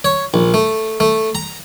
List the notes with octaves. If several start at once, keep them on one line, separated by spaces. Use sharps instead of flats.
C#5
A#1
A3
A3
A#5